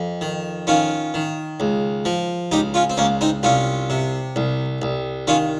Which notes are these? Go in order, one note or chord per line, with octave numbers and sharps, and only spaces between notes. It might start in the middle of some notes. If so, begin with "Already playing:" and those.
Already playing: F2
D#3
D#3 C#4 F4
D#3
C#2
F3
C#2 D#4 G4
C#4 F4
C4
C#2 A#3 C#4
C4 D#4
C2 C#4 F4
C3
C2
C2
D#3 C#4 F4